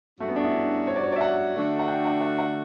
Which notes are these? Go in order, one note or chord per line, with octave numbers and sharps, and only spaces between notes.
G2 F#3 A3 C#4 F#4
B3
D4
E4
C#5
D5
C#5
D5 E5
F#5
D3 A3 D4 F#4
F#5
G5
F#5
F#5
F#5